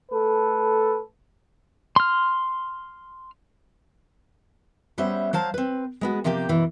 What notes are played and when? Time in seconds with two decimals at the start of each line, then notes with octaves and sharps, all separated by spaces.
0.11 A3 A4 B4
1.96 C6 F6
4.98 G3 B3 C#4 C5 E5
5.33 F#3 C5 F5 A5
5.54 C4 B4
6.01 G#3 B3 F#4
6.24 C3 F3 A#3 G4 D#5 G5
6.49 F#2 B2 E3